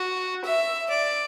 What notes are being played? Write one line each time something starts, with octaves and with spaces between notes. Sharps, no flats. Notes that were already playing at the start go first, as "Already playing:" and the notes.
Already playing: F#4
E5
D5